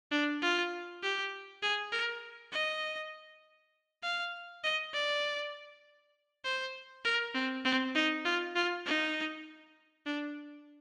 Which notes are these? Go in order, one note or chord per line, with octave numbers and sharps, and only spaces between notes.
D4
F4
G4
G#4
A#4
D#5
F5
D#5
D5
C5
A#4
C4
C4
D#4
F4
F4
D#4
D4